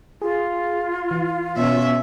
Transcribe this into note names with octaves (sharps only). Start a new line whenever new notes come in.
F4 G#4
E3
B2 C#4 E5